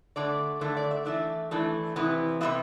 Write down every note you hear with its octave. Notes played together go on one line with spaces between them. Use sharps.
D3 A3 D4 D5
D3 A3 D4 E5
D5
E5
E3 A3 D4 E5
E3 A3 D4
C3 E3 B3
C3 E3 B3 E5